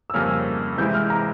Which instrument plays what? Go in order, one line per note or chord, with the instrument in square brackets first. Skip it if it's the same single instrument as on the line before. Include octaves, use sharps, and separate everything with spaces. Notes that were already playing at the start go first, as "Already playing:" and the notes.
[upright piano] E6
[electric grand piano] F2 C#3 G3 A#3 C#4 [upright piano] F6
[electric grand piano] C3 E3 G#3 E4 [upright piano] G6
[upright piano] F6
A#5